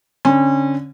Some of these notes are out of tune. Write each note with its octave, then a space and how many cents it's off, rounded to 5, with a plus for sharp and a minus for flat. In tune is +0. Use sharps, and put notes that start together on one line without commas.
D3 -25 C#4 -30